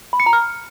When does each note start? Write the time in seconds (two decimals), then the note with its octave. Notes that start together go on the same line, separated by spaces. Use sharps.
0.13 B5
0.20 C#7
0.26 A#5
0.33 F6